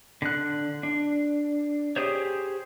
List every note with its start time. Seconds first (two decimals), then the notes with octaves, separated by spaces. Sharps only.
0.22 D3 F#6
0.83 D4
1.96 G4 G#4 C5 C#5